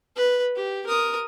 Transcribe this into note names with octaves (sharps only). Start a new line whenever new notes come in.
B4
G4
A#4 D#6